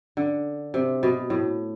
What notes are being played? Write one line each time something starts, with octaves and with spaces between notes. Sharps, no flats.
D3
C3
B2
A2